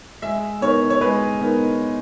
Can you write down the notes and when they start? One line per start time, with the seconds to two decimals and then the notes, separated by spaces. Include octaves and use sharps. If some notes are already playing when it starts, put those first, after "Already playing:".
0.22 G#3 E5
0.61 B3 D#4 A#4 C#5
0.90 C#5
1.01 G#3 B4
1.40 B3 D#4 A#4